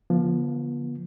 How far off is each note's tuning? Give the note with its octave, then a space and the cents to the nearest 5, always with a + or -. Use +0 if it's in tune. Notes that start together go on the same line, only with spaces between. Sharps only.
D3 -40 F3 +0 B3 -45